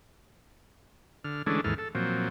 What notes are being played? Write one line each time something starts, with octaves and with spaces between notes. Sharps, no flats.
D3 F6
D3 E3 G#3 A3 C#4 D4
D#2 G#2 E3 A4 F6
A4
A#2 F3 F#3 C4